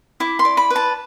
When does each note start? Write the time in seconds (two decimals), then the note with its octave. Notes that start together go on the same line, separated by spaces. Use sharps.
0.20 E4 D6
0.39 C6
0.45 D5
0.57 B5
0.70 B4
0.76 A5